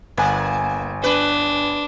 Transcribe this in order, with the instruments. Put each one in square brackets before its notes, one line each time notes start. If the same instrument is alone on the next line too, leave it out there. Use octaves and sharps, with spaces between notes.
[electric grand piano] G1 G#5 [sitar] A#3
[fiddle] D4 [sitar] B4